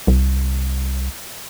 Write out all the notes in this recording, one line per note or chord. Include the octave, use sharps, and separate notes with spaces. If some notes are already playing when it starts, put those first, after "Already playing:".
C2